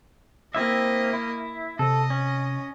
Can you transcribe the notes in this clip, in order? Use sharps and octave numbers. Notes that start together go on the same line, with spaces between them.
A#3 C4 E4 D#5 E5
E4
C3 A4 D#5
C#4